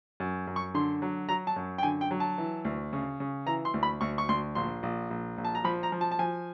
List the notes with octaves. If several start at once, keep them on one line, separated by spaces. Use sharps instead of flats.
F#2
F#2
C#6
D3 C6
F#3
F#3 A#5
A5
F#2
G5
D3 G#5
G5
F#3
A5
E3
D2
C#3
C#3
E3 A#5
C6
D2
B5
D2 C#6
C#6
D2 C6
A#1 C6
A#1
A#1
A#1
A5
A#5
F3 B5
A#5
F3
A5
A5
F3 G#5